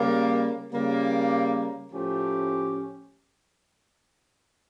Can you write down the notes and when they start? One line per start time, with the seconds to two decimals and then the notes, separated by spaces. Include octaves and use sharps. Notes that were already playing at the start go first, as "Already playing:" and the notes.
Already playing: C#3 G3 A#3
0.72 C#3 G3 A#3
1.92 A2 F3 A3 C#4 G4